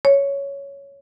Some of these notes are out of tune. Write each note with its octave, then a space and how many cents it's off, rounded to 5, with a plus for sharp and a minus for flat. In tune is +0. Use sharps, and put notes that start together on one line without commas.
C#5 +5